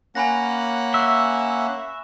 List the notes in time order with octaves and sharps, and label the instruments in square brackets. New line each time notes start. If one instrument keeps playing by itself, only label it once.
[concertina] A#3 C#4 F#5 [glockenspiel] G#5 B5 A#6
[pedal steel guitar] E5 [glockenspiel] C#6 F#6